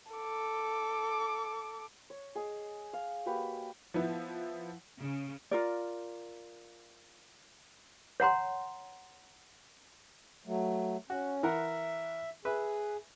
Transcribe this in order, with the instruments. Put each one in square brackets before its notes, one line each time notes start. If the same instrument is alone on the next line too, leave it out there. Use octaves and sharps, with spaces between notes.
[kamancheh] A4 D6
[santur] C#5
G#4 D#5
F5
A#3 F#4 G4 B4
[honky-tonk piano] F3 B3 E4
[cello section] C#3
[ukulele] F4 A#4 D5
[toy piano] C#5 F#5 A#5 C6
[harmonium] F#3 A3
[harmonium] C#4 [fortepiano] F#4
[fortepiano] E3 A#4 F#5 [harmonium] E5
[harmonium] G#4 [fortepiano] B4 E5